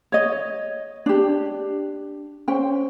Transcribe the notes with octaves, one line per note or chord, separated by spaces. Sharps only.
C#5 D#5
D4 G4
C#4 C5 G5